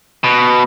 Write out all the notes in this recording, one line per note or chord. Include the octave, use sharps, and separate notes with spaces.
B2